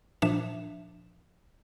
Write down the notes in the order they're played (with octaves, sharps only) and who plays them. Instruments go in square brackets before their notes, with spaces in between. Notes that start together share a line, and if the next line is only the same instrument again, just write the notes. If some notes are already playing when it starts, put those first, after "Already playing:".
[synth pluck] A#2 F3 D4 E5 E7